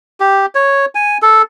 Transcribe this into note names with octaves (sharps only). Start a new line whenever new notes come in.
G4
C#5
G#5
A4